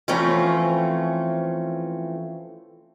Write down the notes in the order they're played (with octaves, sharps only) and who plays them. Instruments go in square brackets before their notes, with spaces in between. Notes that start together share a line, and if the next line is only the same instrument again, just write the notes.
[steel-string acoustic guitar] E3 F3 A3 C4 C#4 A#5